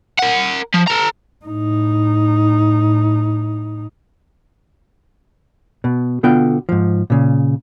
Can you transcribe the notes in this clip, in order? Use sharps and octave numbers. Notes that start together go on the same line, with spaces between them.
A#4 F#5
F3
A4 A#5
A2 D#4
B2
B2 D3 B3 F4 G5
G#2 F3
A#2 C#3